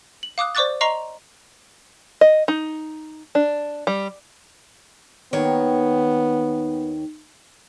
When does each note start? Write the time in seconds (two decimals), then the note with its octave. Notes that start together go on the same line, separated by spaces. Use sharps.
0.23 F#7
0.38 F5 D6 D#6 F#6
0.55 C5 D5 C#6 D6 F#6 A6
0.81 D#5 A#5 C6 C#6 C7 F7
2.21 D#5
2.48 D#4
3.35 D4
3.87 G3
5.33 D#2 D#3 B3 C#5